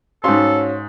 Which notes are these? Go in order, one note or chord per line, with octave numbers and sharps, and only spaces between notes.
G#2 C#4 F#4 A4 C#5 F5 C6